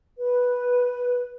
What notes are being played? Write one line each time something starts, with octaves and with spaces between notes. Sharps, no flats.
B4